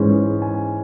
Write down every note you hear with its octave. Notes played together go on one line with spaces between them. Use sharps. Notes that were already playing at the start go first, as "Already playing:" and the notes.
Already playing: G#2 E3 G#3 C#4
G#5